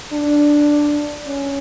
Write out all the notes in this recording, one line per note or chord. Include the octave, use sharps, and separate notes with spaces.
D4
C#4